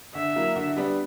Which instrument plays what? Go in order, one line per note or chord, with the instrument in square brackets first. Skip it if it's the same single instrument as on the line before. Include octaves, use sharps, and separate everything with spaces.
[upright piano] D3 [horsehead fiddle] E5
[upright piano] F#3 A#3 E4
D3
G3 B3 D4